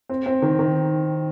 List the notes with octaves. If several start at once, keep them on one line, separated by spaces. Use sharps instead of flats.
C4
C4
D#3
D#3